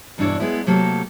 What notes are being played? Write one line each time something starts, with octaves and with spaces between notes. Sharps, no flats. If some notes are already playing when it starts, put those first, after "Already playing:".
E2 G2 B2 D4 E4 C#5
G#3 B3 E4
C3 F#3 A3 A#3 G4 A4